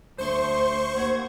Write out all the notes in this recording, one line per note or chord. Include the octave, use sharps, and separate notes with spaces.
D2 C5 C6 C#6
D#2 F#5 G#6